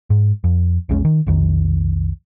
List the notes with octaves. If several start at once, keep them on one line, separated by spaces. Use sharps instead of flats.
G#2
F2
A#1 E2 G#3 C#4
D#3
B1 F2 D#3